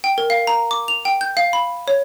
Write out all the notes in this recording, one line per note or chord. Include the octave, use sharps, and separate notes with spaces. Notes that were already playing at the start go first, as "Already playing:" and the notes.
G5
A#4
F5
A#5
D6
F7
G5
G6
F5
B5
C#5